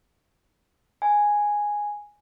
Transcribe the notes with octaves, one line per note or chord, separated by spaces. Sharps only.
G#5